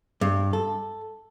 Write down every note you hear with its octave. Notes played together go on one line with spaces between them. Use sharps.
G2
A4